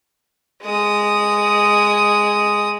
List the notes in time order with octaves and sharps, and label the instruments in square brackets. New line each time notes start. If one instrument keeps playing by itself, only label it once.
[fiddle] G#3 D#6